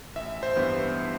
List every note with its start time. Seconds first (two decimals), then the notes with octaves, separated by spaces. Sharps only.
0.16 A1 E5
0.43 C5
0.56 G2 E3 G3 B3